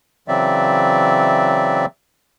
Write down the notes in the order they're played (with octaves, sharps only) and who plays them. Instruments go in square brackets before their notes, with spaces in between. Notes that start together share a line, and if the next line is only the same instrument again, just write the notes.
[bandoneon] C#3 E3 F#3 C4 D5 E5